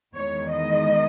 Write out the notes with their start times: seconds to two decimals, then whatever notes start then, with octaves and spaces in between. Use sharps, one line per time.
0.14 E2 D#3 G#3 C#5
0.51 D#5